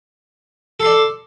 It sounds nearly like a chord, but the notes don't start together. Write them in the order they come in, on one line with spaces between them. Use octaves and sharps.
A4 C6 D5